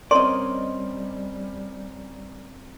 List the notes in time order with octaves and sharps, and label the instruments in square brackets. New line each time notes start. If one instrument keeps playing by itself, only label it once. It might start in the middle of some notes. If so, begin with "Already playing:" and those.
[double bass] G3 [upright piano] C4 C#4 A#4 [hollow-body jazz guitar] D5 D#5 [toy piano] C6